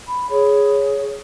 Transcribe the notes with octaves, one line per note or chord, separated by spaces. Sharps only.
B5
G#4 C#5